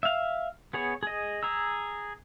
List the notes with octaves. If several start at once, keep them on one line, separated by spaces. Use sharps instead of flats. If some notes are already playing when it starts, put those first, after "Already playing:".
E5 F5
B3 G#4 C#5
G#4 D#5
G#4 A#5 E6